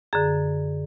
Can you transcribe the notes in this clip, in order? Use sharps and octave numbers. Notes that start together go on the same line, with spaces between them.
F#2 D3 G#4